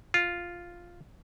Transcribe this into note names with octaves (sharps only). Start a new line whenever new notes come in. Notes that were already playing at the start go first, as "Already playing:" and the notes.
F4